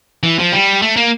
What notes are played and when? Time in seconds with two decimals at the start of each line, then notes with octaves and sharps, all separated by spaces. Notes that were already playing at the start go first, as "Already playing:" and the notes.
0.23 E3
0.39 F3
0.52 G3
0.82 A3
0.96 A#3